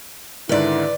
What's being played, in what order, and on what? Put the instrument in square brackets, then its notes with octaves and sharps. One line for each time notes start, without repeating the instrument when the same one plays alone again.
[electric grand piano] G#2 D3 D#3 [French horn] E4 [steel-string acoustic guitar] B4 D5